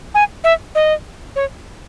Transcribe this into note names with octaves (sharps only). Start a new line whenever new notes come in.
G#5
E5
D#5
C#5